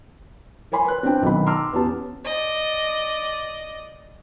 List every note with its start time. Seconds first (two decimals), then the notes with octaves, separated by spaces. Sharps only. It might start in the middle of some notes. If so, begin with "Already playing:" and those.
0.72 A#4 C#5 G#5 B5 C6
0.85 B4 F#6
1.03 C4 D4 G5
1.22 B1 D#3 B5
1.46 A5 A#5 C6 D6 E6 F6
1.72 E2 B3 C#4 G4 A5
2.25 D5 D#5